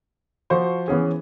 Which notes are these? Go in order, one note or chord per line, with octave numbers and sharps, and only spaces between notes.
F3 F#4 C5 C#6
E3 B3 C#4 G#4